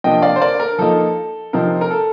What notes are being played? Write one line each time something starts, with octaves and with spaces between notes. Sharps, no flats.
C3 F3 A#3 D4 D#5 G5
D5 F5
C5
A#4 D5
A#4
F3 A#3 D#4 A4
C3 F3 C4 D#4 A#4
A#4
A4